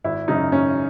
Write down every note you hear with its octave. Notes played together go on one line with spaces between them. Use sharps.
G#1 E4
F#2 C#3 D#4
G#1 C#4